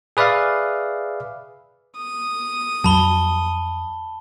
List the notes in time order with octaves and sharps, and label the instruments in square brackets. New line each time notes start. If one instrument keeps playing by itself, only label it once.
[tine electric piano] G#4 B4 D5 E5 F5
[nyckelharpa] D#6
[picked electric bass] F2 F#3 [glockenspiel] A5 B5 G7